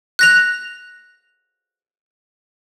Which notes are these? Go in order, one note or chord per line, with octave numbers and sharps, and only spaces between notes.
F#6 A#6 F7